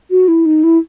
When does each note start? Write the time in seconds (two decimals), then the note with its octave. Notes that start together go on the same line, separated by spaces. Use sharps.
0.11 F#4
0.28 E4
0.46 D#4
0.64 E4